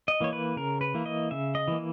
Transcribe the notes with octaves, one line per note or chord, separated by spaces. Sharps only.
D#5
E3 A#3 C#5
B4
C#3 A#4
B4
E3 A#3
D#5
C#3 E5
D#5
E3 A#3